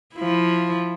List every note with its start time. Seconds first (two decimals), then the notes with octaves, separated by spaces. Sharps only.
0.14 F3 E4